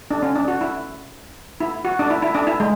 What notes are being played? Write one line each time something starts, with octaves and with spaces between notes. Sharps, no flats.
D4
C#4
D4
F#4
E4
E4
F#4
D4
E4
E4
D4
E4
G#3